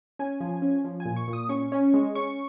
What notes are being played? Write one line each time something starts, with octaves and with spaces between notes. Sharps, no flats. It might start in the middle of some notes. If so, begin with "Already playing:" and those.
C#4 G#5
F3
C#4
F3
G#5
A#2
C#6
A#2
D#6
C#4 C#6
C#4
G#3
C#4 C#6